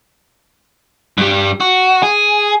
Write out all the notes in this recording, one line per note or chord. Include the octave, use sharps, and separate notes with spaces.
G2 G3
F#4
G#4